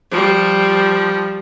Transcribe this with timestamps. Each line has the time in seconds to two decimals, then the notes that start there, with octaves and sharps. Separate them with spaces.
0.11 F3 G3